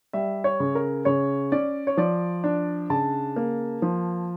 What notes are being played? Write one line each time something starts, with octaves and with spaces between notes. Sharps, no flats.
G3 E5
C#5
C#3
A#4
C#3 C#5
C#4 D5
C#5
F3 D5
D4
C#3 A5
A#3
F3